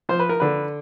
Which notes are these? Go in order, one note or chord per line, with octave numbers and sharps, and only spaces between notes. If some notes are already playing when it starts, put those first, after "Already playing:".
F3 C5
B4
A#4
D3 B4